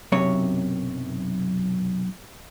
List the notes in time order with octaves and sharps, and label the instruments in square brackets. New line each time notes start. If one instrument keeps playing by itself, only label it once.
[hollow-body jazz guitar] B1 F#2 C3 C#5